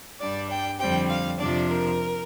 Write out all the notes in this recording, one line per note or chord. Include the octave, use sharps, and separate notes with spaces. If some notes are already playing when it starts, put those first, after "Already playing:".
G2 G3 D4 D5
G5
F2 D3 G3 C4 G5
F5
F2 C3 F3 D4 D5
A#4